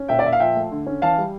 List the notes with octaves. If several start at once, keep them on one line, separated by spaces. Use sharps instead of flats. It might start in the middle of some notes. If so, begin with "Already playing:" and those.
Already playing: C#4
A#2 E5 G5
D5
A#2 E5
F5
F3 E5 G5
A3
D3
C#4
E3 F5 A5
G3